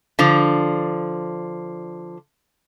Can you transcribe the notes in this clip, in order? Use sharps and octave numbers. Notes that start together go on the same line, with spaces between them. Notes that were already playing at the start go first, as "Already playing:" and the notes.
D3 F3